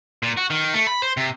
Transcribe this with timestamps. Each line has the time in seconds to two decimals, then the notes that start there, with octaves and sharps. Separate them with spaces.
0.23 A#2
0.37 F#4
0.50 D#3
0.74 A3
0.87 B5
1.02 C5
1.17 C3